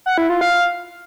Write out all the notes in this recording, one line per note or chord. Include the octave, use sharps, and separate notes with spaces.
F#5
E4
F4
F5